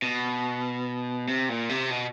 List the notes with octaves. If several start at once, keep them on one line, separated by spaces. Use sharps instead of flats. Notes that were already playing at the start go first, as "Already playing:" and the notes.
B2
C3
A#2
C3
B2